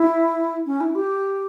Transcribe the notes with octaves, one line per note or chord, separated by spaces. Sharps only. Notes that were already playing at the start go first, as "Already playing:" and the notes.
Already playing: E4
C#4
E4
G4